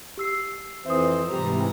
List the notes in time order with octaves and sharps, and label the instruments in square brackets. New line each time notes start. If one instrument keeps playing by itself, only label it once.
[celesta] G4 E6 C7
[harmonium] F2 E3 C5 [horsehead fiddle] C4 [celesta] E5 D#6
[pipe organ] G#2 C3 E3 [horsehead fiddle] G3 A#5 [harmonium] G4